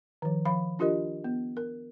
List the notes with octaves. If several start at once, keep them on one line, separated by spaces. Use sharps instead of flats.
D#3 F3
F3 F5 B5
D4 F4 G4 A#4 D#5
B3
A#4